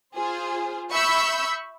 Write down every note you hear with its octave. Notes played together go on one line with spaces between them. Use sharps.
F4 G#4 C5
E5 B5 C#6 E6 G6 B6